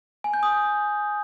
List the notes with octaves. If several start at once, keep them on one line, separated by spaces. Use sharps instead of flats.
G#5
G6
D#6